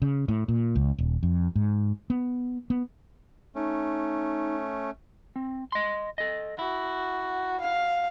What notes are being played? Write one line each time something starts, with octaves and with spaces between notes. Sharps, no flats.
C#3
A2
A#2
C#2
D#1
F2
G#2
B3
B3
A3 C#4 D#4
C4
D#5 C6
A4 D#5
E4 F#4
F5